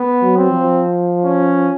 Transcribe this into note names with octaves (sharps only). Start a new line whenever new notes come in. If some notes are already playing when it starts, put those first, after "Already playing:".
Already playing: B3
F#3
C4
F3
C#4